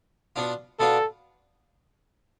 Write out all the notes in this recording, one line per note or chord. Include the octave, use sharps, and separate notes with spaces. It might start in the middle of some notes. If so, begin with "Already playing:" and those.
B2 B3 D4 F4
B2 B3 D4 F4 A4